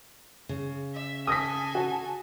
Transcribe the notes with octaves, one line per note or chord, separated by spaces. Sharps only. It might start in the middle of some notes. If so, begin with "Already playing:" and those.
C#3
E5
A4 G#5 D#6 A#6 B6
F#4